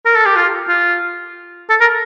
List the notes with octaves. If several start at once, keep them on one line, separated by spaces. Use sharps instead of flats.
A#4
A4
G4
F4
F4
A4
A#4